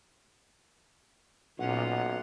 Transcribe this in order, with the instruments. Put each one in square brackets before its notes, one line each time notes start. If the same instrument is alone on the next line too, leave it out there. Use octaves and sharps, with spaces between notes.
[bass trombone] B1 [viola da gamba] A#2 C#4 F4 [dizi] F#5